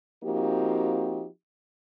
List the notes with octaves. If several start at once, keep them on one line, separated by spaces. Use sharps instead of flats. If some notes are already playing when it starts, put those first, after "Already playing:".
F3 A#3 C4 D#4 F#4 G4